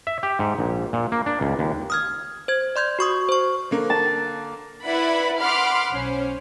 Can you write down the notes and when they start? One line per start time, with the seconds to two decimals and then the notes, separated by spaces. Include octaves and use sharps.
0.07 E5
0.23 G4
0.39 G#2
0.59 A#1
0.93 A#2
1.12 A#3
1.26 D4
1.41 C#2
1.59 D#2
1.90 D#6 F6 G#6
2.48 C5 G#6
2.76 D5 C6 G6 G#6
2.99 F#4 C#6 D#6
3.29 C5 C#6
3.71 D3 A#3
3.90 A5
4.85 E4 B4 D5 F#5 B5
5.40 F#5 B5 C6 D6 F6
5.93 B1 C#4 C5